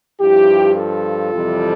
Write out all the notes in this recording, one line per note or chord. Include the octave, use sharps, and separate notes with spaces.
G2 F3 E4 G4
F4 A4
F2 C3 E3 G3